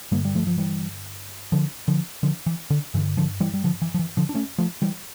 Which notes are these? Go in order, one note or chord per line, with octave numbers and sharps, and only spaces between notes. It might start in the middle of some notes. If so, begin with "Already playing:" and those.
G2 D3 G3 A#3
G3
F3 A3
F3
E3 G3
D3 F3
D3 F3
D3 F3
E3
D3
G2 D3 E3
D3 F3
E3 G3
G3
D3 F3
E3
F3
E3
D3 F3
D4
A3 C#4
F3 A3
E3 G3